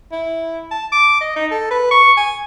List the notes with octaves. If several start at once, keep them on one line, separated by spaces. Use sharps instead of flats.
E4
A5
D6
D#5
D#4
A4
B4
C#6
G#5